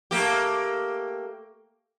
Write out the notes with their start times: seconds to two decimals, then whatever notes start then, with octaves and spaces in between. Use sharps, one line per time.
0.11 A3 A#3 G4